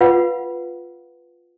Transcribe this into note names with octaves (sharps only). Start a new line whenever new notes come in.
F4 B4 F5 F#5